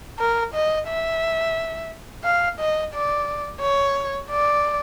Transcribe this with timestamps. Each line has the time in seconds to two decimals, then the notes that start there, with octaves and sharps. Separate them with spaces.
0.19 A#4
0.54 D#5
0.88 E5
2.24 F5
2.59 D#5
2.93 D5
3.61 C#5
4.30 D5